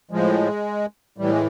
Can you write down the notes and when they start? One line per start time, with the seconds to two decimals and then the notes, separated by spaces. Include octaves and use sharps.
0.11 A2 F3 G#3
1.18 A2 E3 G3
1.30 G#3